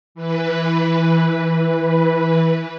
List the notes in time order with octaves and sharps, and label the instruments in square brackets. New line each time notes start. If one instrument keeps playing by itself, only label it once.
[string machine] E3 B4